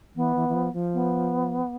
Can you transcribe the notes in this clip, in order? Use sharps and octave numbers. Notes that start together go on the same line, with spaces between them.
E3 B3
E3
E3
F3
F3
B3